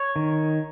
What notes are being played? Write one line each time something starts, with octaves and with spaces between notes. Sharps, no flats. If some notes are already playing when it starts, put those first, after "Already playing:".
Already playing: C#5
D#3